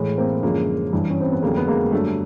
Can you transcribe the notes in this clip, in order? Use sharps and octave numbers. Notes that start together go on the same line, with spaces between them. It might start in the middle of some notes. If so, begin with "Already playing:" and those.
Already playing: A2 E3 G#3
A#3 C4
F#2 D3 F3 G#3 A#3
G2 E3 G3
C#4
C4
B3
F2 D3 F#3 G#3 A#3
B3
G#3 A#3
G2 D3 F#3 A3